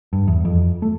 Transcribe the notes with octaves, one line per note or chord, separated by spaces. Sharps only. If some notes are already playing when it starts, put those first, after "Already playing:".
G2
E2
F2
A3